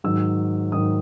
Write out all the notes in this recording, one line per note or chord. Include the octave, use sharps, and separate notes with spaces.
G#2 D#3 F#3 E6
G#2 D#3 F#3 D#6